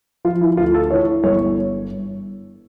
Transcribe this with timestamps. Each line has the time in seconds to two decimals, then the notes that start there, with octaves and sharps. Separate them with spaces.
0.25 F3 F4
0.41 E4
0.57 D2 F4
0.74 A4
0.90 E3 C#5
1.23 G1 C#5